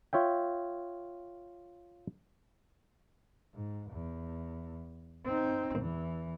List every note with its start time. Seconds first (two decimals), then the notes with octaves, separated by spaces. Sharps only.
0.13 F4 C#5 E5 G5
3.54 G#2
3.91 E2
5.25 C4 D#4
5.79 E2 E3